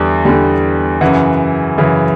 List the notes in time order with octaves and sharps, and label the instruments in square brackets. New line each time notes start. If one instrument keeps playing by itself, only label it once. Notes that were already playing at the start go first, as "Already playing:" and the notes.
Already playing: [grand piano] E2 D3 G3
E2 D3 G3
F#2 C#3 E3 F#5
F#2 C#3 E3